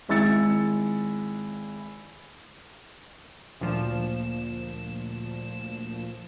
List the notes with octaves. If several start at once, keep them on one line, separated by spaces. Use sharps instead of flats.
G#1 G#3 E4 E6 A6 C#7
D2 A#2 F3 E7